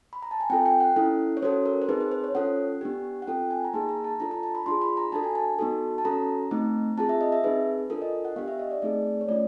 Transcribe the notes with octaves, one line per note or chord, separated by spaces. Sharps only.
B5
A#5
A5
G#5
C4 F4 A4 G5
G5
F#5
C#4 E4 A4
C#5
C#4 F#4 A4 C5
A#4
C5
C4 D#4 G#4 B4
C5
C5
C#5
C#4 F4 A4 F#5
B3 D4 G4
F#5
C4 F4 A4 G5
G#5
A#5
A#3 D#4 G#4 A5
A#5
A5
D4 F4 A4 A#5
A#5
A5
B5
D4 F4 G#4 C6
B5
A#5
D4 F#4 A4 A5
G#5
A5
B3 D#4 F#4 A4
A5
C#4 F#4 A4 A#5
A3 C4 D#4
C4 F4 G#4 A5
E5
D#5
E5
C4 D#4 G#4 B4
D4 F4 A4 A#4
D#5
F#5
B3 D4 G4 F5
E5
D#5
D5
A3 C4 D#4 G#4 D5
C#5
A3 C#4 F4 D5